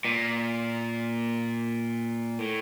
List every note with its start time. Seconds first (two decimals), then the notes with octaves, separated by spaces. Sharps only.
0.05 A#2
2.39 A2